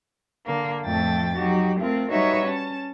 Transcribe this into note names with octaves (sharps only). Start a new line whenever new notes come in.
D3 A#3
F2 A2 F3 A3 G5 A6
F#3 D#4 F#4 G4
A3 C4 F4 A#4
G3 D#4 F#4 B4 C#5 E5
C#4 A5